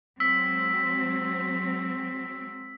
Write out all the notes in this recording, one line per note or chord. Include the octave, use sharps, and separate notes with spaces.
F#3 G#3 C4 E6 B6